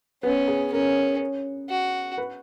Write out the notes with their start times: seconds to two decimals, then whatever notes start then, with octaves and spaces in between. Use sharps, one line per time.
0.23 B3 C#4
0.48 G#4
0.72 C#4 A#4
1.70 F#4
2.18 B4